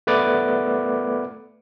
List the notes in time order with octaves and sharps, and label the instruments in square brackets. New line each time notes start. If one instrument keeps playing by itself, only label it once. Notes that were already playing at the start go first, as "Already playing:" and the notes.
[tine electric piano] A3 B3 B4 D5 D6